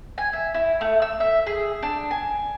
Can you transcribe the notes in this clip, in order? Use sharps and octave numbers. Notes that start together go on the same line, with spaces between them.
G#5
E5
E4
A3
E6
E5
G#4
D4
G#5